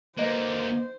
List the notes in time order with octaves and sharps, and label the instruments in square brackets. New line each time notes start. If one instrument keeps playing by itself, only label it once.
[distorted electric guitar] D3 A#3 [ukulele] B4 D#5 [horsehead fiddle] C5